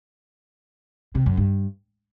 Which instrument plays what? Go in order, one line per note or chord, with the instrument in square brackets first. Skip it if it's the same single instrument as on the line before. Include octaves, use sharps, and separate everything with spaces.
[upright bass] C3
F#2
G2